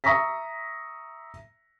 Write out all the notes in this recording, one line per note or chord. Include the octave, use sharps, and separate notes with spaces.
E5 A#5 C#6 D#6 A#6 B6